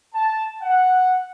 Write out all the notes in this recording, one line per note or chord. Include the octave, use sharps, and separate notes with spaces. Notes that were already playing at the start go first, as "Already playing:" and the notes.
A5
F#5